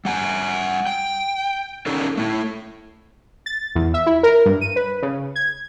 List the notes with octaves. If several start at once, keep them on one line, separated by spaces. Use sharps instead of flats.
G3 F#5 G#5
G5
C#4 D#4 A4 A#4
A3 E4
A6
E2
E5
E4
A#4
G2
D#7
B4
C#3
G#6